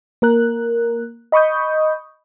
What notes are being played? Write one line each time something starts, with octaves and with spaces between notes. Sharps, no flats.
A#3 A#4 F#6
D#5 B5 C#6 D#6 G6